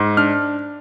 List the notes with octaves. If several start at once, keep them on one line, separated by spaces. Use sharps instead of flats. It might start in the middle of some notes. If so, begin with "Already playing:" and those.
Already playing: G#2
D4 F6